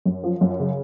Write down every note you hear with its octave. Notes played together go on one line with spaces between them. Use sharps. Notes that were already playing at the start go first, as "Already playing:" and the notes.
F#2
F3
F#2
C#3